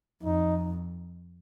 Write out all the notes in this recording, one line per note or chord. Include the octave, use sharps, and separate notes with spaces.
F2 D#4